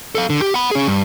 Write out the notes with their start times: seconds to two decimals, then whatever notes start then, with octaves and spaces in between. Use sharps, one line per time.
0.15 A4 F5
0.30 D3
0.42 G4
0.54 F#5 B5
0.71 C#4 G#4
0.87 G2